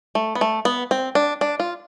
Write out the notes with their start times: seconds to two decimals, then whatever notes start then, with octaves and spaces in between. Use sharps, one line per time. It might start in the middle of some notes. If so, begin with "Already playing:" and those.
0.15 A3
0.35 B3
0.41 A3
0.65 B3
0.91 C4
1.15 D4
1.41 D4
1.60 F4